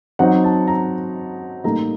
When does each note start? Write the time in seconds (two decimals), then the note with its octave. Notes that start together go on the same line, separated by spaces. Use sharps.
0.19 F#3 C4 D#4 F#5
0.44 A5
0.67 A#5
1.64 A2 G3 A#3 D#4 A#5